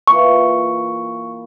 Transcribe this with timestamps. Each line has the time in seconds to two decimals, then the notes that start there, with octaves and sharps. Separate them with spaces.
0.07 E3 A#3 F4 C#6